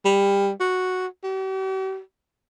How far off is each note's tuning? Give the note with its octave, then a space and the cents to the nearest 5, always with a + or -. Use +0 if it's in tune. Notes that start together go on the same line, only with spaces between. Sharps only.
G3 +20
F#4 -5
G4 -45